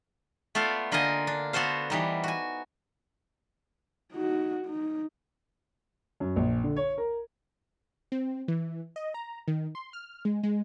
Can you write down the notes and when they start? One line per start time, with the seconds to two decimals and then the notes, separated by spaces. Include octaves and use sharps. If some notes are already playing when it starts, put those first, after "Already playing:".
0.55 A3 B3 F4 A4 D5 F5
0.92 D3 A#3 F4 A#4 D#5 G#5
1.27 D4
1.53 B3 F#4 A4 C5 F5
1.90 E3 G3 D#4
2.24 F#4 G#5
4.13 D#4 F#4
4.67 D#4
6.20 F#2
6.36 A#1
6.64 D3
6.76 C#5
6.98 A#4
8.12 C4
8.48 E3
8.96 D#5
9.14 A#5
9.48 D#3
9.75 C6
9.93 F6
10.25 G#3
10.43 G#3